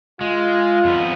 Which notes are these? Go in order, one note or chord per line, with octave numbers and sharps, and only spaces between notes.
G#3 F4
F2 B3